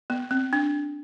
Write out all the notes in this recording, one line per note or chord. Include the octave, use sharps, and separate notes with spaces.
B3
C4
D4